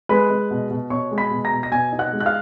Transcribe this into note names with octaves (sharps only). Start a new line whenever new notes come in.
G#3 B4 B5
G#3
B2
B2
B2 C#5 C#6
G#3
B5 B6
B2
A#5 A#6
B2
A#6
B2 G#5 G#6
D#4
F#5 F#6
G#3
F#6
F5 F6